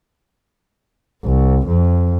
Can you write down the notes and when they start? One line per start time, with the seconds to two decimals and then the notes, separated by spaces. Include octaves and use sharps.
1.24 C2
1.67 F2